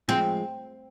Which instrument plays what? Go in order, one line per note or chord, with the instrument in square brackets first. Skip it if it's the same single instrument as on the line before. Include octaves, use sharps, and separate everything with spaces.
[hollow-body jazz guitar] F3 G#3 [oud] C4